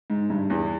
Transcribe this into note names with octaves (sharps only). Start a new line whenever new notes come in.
G#2
G2
E2